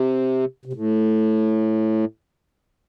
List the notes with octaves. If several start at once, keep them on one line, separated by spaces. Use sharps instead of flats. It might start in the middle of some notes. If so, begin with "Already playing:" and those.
Already playing: C3
C3
A2